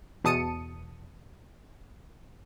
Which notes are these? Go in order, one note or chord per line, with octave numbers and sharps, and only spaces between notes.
E2 B2 A5 D#6 C#7 D#7